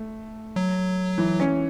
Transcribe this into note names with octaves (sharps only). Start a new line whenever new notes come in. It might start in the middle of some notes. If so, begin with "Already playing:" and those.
Already playing: A3
F#3
E3
C#4